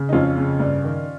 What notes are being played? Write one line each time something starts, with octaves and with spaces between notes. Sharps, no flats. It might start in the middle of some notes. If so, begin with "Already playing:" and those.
Already playing: C#3
D#4
F2 C#4 F4
C#3
G2
D#3